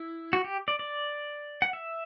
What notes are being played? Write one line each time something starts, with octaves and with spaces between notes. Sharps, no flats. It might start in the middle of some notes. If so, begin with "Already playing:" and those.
Already playing: E4
F#4
G4
D5
D5
F#5
E5